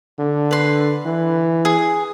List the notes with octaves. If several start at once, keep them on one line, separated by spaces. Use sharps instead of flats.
D3
B4 C6
E3
G#4